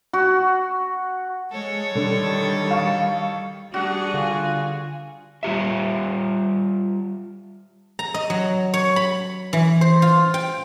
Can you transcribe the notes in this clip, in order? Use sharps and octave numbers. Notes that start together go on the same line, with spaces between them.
F#4
G#3 A4 C#5
D3 D#3 G3
F5 C#6
G3 D4 F#4 G#4 F#5
D3 F4 G#5
G3 F4 G4 E5
A#5
D#5
F#3
C#5
B5
E3
C5
F4
G5